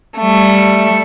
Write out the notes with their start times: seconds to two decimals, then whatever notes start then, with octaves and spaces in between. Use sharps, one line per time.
0.19 G3 A3